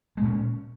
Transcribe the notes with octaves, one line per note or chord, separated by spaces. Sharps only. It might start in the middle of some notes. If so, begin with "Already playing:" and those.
A#2 G#3 C#4